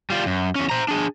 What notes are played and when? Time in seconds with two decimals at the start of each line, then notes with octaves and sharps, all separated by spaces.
0.10 G3 F4
0.26 F#2
0.55 E2 C#4
0.70 C5 A#5
0.88 D4 G#4